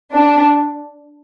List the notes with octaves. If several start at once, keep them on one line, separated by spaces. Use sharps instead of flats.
D4